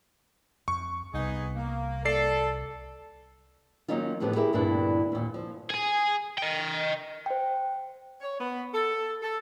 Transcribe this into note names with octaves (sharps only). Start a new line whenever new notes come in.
F2 C#6
C2 G3 B3 D#4 G#4
A#3
A4 D5 C7
D#3 F#3 A#3 C#4 D#4 F4
A2 D3 F3 B3 G4
E4 G4 G#4 A#4 E5
D2 G2 A#2 B3 D4 E4
D#2 A#2
F3
G#4 G#5
D#5 G5
C5 G5
C#5
B3
A4
A4